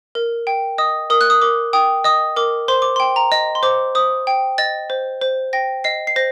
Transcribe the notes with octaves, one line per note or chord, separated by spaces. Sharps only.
A#4
G5
D#5 D#6
A#4 D#6
F#6
D#6
A#4 D6
G5 D#6
D#5 D#6
A#4 D6
C5 C6
D6
G5 C6
A#5
D#5
C6
C5 D6
C5 D#6
G5
D#5 A6
C5
C5
G5 A#6
D#5 C7
C7
C5 A#6